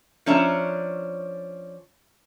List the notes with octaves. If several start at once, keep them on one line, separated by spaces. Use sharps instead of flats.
F3 C#4 D4 C#5 E5 A#5